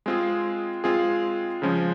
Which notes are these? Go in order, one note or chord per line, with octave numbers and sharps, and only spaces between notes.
G#3 C4 F4 G#4
G#3 C4 F4 G#4
C#3 F3 G#3 C#4